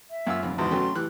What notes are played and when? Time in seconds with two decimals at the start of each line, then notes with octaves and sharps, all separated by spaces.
0.11 E5
0.27 F#2 A#3 F4 E6
0.42 D#1 F2 C3 B5
0.58 E2 G#2 B2 C6
0.71 F#3 A3 C#4 G5
0.96 A2 E3 G4 F#6